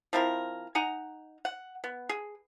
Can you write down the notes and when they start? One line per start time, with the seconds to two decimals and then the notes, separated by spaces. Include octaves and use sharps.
0.13 F3 C4 E4 A#4
0.75 D#4 F#5 G#5 A#5
1.45 F#5
1.84 B3
2.09 G#4